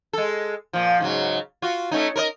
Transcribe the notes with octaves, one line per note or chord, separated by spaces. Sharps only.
G#3 A4
A#2 F3
G#2 C#3 F#3
F4 F#4
A3 C#4 D#4
A#4 B4 D#5